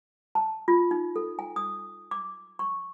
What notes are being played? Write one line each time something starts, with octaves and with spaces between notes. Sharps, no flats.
A5
F4
D#4
A4
G#5
D#6
D6
C#6